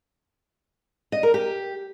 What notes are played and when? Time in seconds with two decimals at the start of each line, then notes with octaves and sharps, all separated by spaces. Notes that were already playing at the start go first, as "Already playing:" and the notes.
1.12 D#5
1.23 A#4
1.34 G4